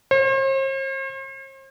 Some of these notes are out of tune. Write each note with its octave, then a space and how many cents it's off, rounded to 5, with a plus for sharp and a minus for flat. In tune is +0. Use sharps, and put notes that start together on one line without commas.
C5 +45